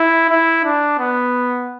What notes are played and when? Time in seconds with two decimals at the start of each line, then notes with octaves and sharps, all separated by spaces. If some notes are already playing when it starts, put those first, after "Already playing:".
Already playing: E4
0.30 E4
0.64 D4
0.99 B3